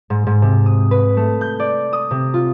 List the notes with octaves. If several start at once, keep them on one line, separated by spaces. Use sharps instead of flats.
G#2
G#2
C3
D#6
B4
A3
G6
D5
D#6
C3
F4